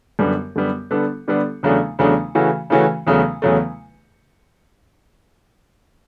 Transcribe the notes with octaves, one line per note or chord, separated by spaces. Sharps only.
F#2 D3 G3 B3
F#2 D3 G3 B3
D3 G3 B3 D4 A4
D3 G3 B3 D4 A4
E2 C#3 F#3 A3 D4
E2 C#3 F#3 A3 D4
C#3 E3 A3 C#4 F#4
C#3 E3 A3 C#4 F#4
E2 C#3 F#3 A3
E2 C#3 F#3 A3